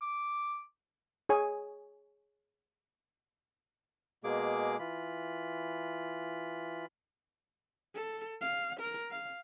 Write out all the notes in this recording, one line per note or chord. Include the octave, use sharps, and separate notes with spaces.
D6
G#4 C#5 G#5
B2 G#3 A#3 G#4 D6
E3 F4 B5
A4
F5
A#4
F5